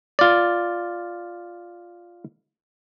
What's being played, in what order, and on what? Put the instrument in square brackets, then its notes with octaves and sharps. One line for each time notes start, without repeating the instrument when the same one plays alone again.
[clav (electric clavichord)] F4 D5